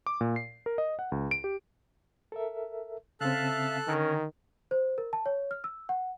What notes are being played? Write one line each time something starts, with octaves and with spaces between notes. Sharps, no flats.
D6
A#2
C7
A#4
D#5
F#5
C#2
D7
G4
A4 A#4 E5
C#3 C4 A4 E5 F5 A5 F#6
D3 D#3 C#4 A#4
C5
A#4
A5
C#5
F6
E6
F#5